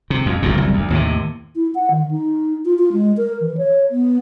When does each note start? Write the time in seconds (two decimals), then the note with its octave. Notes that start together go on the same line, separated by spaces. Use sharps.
0.10 C3
0.26 F2
0.42 G1 E2 A#2
0.54 F#1 C2
0.73 D2
0.90 D#2 A2 C3
1.56 E4
1.75 F#5
1.91 D#3
2.11 D#4
2.65 F4
2.79 F4
2.93 G#3
3.17 A#4
3.41 E3
3.57 C#5
3.91 B3